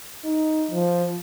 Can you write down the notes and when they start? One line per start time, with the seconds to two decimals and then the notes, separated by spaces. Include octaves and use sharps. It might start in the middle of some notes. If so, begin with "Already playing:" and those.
0.24 D#4
0.71 F3